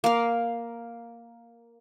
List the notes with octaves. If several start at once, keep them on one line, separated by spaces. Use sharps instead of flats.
A#3 F5